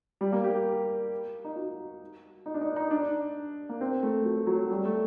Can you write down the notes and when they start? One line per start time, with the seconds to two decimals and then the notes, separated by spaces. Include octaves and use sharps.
0.21 G3
0.32 A#3
0.44 G4
1.44 D#4
1.56 F#4
2.46 D#4
2.54 D4
2.61 D#4
2.76 D#4
2.91 D4
3.69 A#3
3.81 C4
4.03 A3
4.25 F#3
4.47 F#3
4.71 G3
4.85 A3